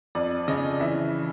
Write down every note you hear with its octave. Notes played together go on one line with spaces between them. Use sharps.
F2 D5
C#3 D#5
E3 E5